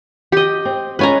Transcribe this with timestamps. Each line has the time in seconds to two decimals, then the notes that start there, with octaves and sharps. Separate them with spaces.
0.32 G4 D#5
0.65 C4
0.99 G#3 C#4 F4 B4 G#5 A#5